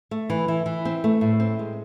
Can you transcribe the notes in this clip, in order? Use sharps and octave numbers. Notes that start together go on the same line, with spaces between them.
A3
E3
E3
E3
C4
A3
A2
C4
G#3